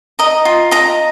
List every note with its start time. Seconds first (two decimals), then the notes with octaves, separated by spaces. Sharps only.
0.19 D#5 A#5
0.45 F4
0.71 D#5 A#5